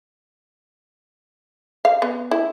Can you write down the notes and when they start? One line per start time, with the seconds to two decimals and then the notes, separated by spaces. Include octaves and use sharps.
1.85 F5
2.02 B3
2.31 E4